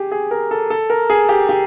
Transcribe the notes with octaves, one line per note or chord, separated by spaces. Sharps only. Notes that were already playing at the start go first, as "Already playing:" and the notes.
Already playing: G4 G#4
G#4
A#4
A4
A4
A#4
G#4
G4
G4